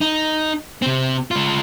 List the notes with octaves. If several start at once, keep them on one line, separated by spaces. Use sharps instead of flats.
D#4
C3 C4
G#3 F4